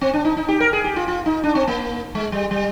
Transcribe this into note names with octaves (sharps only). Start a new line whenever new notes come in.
C4
D4
D#4
D#4
G4
A#4
G#4
G4
F4
F4
D#4
D4
C4
A#3
G#3
G3
G3